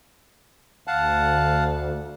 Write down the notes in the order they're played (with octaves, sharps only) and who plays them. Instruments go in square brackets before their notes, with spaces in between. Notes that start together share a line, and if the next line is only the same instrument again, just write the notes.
[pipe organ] D2 [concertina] F5 F#5 A5